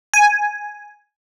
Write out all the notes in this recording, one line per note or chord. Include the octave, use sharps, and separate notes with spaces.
G#5